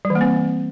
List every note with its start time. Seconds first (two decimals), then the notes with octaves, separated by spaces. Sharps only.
0.05 G3
0.10 E3
0.15 A#3
0.21 C4